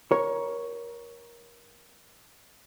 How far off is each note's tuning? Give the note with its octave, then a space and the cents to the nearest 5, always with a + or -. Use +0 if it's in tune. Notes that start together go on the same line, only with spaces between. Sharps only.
A#4 +25 C#5 +0